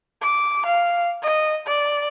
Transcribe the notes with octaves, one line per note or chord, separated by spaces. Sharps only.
D6
F5
D#5
D5